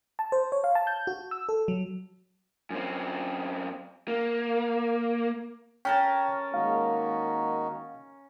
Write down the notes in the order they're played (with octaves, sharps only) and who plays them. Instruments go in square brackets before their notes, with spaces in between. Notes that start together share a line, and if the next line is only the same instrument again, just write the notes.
[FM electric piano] A5
C5
C#5
F5
A5
G6
F#4
E6
A4
F#3
[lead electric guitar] F#2 C4
A#3
[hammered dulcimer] C#4 A#4 A5 [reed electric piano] G5
[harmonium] D#3 D#4 F#4 [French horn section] G#3 A#3 [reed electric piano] F5